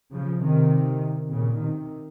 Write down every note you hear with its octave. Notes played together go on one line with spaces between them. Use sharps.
C#3 F3
C3 D#3
A#2 C#3
C3 D#3